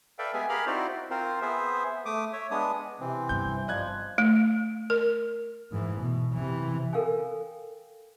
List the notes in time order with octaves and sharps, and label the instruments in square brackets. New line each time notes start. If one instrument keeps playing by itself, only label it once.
[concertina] A4 B4 D5 E5 F5 G5
G#3 B3 G4 G#4 E5 G#5
G4 G#4 A#4 F5 B5 F6
C4 D#4 E4 F#4 C5 D5
C4 F4 A#4 C5
B3 G#4 C5 E5
A3 D6 D#6
C#5 E5
G#3 B3 D4 D#6
[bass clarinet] C3 [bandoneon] E3 C4
[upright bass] G1 G2 [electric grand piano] G6
[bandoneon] F3 [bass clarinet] G3 [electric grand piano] D#5 F#6 G#6
[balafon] A3
A#4
[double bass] G#2 E3
B2
C3 E3
[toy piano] A4 A#4 F5 G5 G#5